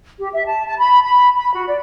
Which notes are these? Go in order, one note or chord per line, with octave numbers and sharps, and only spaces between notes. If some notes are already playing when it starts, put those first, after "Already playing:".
G4
E5
A5
A5
B5
B5
B5
F#4
D5